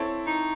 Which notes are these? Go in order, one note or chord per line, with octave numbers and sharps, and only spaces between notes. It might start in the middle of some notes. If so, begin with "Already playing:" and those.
Already playing: C4 E4 A4 C#5
D#4